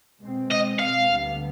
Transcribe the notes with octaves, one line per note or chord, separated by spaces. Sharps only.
B2 G#3 C4
D#5
F5
D2 D3 G3 B3